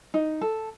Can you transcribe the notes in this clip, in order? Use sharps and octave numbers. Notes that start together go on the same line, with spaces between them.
D#4
A4